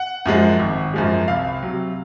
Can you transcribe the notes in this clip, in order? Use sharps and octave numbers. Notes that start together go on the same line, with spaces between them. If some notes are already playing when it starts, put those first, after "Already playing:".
Already playing: F#5
F#2 F3 G#3
G#1
F#2 F3 G#3
C2 F5
C3 F#3